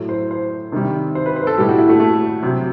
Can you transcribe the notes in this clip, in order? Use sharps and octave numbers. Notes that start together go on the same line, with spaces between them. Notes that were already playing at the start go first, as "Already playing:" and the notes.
Already playing: A2 F#3
C5
C5
C3 D#3 G3
C5
B4
C5
B4
A4
A2 G3 G4
F#4
E4
A3
A3
C3 F#3